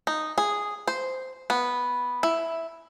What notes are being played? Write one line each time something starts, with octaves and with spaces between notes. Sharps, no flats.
D#4
G#4
C5
B3
E4